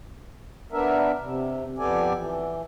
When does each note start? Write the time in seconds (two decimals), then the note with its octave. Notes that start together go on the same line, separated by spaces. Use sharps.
0.72 B3 D4 A#4 E5
1.22 C3
1.78 F2 B3 G4 A4 D5 G#5
2.15 E3